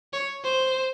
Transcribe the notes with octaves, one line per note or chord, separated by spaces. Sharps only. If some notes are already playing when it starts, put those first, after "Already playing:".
C#5
C5